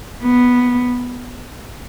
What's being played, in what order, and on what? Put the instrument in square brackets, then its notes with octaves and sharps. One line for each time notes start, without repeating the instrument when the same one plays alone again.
[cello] B3